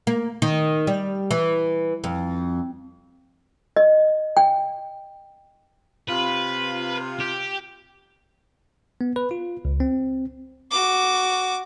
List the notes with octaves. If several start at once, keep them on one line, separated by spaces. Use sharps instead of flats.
A#3
D#3
G3
E3
F2
D#5
G5
C3 F4 B4
G4
B3
B4
F4
C#2
C4
F#4 D6